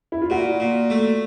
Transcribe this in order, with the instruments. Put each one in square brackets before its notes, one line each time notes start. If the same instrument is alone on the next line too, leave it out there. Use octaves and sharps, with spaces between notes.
[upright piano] E4
F4
[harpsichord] A#2 [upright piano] F#4
[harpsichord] A#2
A3